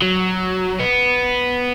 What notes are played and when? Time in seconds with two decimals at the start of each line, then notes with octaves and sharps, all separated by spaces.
0.02 F#3
0.79 B3